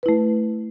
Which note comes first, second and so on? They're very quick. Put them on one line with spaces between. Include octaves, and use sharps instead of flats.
B4 E4 A3